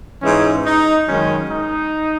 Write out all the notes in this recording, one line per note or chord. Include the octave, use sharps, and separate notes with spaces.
G#2 E3 G#3 C#4
D#4
F#2 D#3 G#3 C#4
D#4